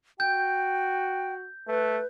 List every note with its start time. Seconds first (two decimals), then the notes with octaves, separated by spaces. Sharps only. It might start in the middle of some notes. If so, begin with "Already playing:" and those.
0.20 F#4 G5 G6
1.68 A3 B4